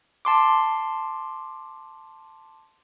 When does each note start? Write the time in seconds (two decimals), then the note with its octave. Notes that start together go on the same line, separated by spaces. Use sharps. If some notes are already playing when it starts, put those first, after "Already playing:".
0.25 A5 C6 D6